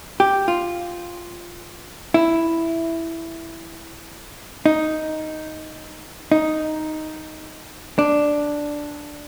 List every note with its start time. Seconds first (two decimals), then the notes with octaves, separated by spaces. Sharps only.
0.20 G4
0.48 F4
2.14 E4
4.66 D#4
6.32 D#4
7.99 D4